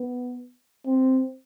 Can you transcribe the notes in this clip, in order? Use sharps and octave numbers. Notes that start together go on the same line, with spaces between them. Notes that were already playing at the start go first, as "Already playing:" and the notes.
Already playing: B3
C4